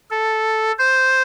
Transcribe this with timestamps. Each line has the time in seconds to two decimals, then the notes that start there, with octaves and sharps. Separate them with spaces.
0.10 A4
0.79 C5